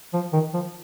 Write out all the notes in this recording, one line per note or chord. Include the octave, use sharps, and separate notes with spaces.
F3
D#3
F3